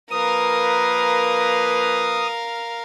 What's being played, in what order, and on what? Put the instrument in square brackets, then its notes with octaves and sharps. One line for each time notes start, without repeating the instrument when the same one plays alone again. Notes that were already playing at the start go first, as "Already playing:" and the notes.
[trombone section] F3 A#3 B4 [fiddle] A#4 F5 [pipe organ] D#6